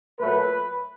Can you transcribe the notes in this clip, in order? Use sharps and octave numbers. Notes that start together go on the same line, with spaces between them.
A#2 F#3 A3 B4